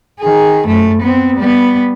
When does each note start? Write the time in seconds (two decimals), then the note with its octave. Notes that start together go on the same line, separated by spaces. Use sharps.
0.20 D#3 G#4
0.67 F#2 A3
1.02 B3 C4
1.37 G3 B3